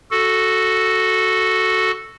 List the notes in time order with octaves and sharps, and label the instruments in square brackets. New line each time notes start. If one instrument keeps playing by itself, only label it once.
[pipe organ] F#4 A4